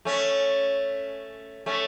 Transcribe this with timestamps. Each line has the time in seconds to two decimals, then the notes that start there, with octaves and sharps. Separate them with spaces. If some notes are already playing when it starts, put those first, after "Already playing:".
0.05 A3 C#4
1.66 A3 C#4